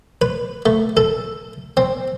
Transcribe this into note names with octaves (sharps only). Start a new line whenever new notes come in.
B4
A3
A4
C4